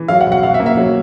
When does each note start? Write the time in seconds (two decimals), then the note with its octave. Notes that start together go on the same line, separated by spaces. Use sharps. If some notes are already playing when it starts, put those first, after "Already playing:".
Already playing: E3
0.08 F#3 F5
0.21 F#5
0.26 B2
0.32 F#5
0.43 B2 F5
0.54 E5
0.60 A#3
0.66 E5
0.77 F#3